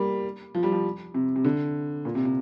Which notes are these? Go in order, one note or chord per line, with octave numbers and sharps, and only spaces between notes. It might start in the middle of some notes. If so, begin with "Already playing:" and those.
Already playing: G3 A#3
F3
G3
F3
C3
C3
D3
A#2
C3
C3